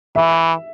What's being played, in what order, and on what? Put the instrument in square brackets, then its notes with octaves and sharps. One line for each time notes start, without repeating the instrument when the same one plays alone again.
[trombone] E3 [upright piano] E5